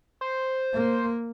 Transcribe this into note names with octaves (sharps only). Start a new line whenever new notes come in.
C5
A#3